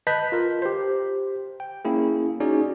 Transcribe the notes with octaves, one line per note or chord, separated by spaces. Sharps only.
B4 D#5 A5 B5 G6 B6
F4 A#4
G4 C5
G5
A#3 C#4 E4 G#4
C#4 D#4 F#4 G#4 D5